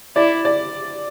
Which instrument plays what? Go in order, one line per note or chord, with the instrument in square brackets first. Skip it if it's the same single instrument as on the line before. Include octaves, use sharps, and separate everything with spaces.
[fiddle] E4 [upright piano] D5
[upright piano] D5